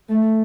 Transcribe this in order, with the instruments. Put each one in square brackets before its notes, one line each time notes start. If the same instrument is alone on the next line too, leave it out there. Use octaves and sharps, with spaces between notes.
[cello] A3